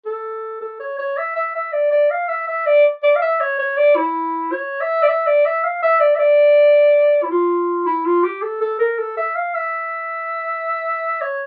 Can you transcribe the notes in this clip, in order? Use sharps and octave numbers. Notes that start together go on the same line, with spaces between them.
A4
A4
C#5
C#5
E5
E5
E5
D5
D5
F5
E5
E5
D5
D5
F5
E5
C#5
C#5
D5
E4
C#5
E5
D5
E5
D5
E5
F5
E5
D5
E5
D5
E4
F4
E4
F4
G4
A4
A4
A#4
A4
E5
F5
E5
C#5